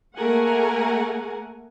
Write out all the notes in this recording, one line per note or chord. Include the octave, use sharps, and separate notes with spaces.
A3 A#3 G#4 A#4 F#5 G#5